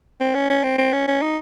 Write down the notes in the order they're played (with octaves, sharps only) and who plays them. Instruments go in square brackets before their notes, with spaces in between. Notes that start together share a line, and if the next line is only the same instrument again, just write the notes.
[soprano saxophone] C4
C#4
C#4
C4
C4
C#4
C#4
D#4